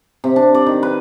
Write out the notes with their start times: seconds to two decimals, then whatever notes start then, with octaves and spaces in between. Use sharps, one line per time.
0.24 C3
0.36 D4
0.54 D5
0.66 D#3
0.83 B4